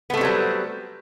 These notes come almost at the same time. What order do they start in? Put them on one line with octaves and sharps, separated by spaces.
B3 A3 C4 G3 F#3